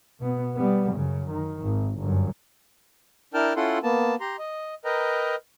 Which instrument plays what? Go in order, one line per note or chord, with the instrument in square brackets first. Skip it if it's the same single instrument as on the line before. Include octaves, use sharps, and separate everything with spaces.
[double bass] B2 B3
G3 B3
F#2 C#3
D#3
G#1
G1 F#2
[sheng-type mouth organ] D4 E4 A#4 G5 A5 F6
C#4 E4 F4 A4 F#5 C6
A#3 B3 A5
G4 A#5 C6
D#5
A#4 B4 D#5 G5 A#5